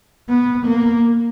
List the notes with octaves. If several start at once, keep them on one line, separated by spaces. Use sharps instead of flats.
B3
A#3